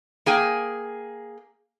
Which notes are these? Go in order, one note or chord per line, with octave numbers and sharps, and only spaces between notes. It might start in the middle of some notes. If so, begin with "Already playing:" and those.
A#3 G#4 G5 G#5